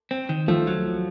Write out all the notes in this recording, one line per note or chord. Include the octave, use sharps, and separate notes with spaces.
C4
D#3
F3 A3
F#3